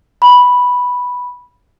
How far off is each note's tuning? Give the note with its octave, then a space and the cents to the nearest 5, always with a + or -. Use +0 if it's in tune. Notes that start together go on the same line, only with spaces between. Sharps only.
B5 -5